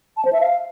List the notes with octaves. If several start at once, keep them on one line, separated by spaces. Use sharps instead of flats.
A5
C5
E5
F5